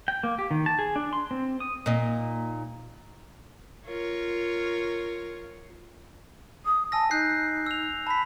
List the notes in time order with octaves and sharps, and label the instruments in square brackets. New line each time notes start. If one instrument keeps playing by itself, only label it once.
[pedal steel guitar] G5
A#3
G4
D#3
A5
G#4
D4
C6
C4
D#6
[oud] A#2 D#4
[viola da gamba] F4 A#4 C#5
[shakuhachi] D#6
[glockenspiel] G#5 E6 A#6 [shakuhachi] A5
[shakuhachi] D#4 [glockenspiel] F#6 G6 C7
[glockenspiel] E6 F7
[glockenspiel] A5 B6 [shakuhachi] B5